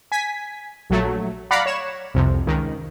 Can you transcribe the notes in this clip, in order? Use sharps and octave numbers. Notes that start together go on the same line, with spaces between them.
G#5 B6
A#1 F#3 A3
D5 F5 F#5 A#5 B5
C#5 E7
C2 F2 C3
C#2 D#3